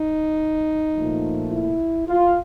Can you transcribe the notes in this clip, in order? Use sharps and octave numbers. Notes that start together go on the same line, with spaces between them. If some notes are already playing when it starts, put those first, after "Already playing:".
Already playing: D#4
A#2 F3 A3
E4
F4